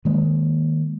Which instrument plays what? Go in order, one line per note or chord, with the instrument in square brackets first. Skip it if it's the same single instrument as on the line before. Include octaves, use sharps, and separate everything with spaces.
[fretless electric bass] D#3 G#3 A#3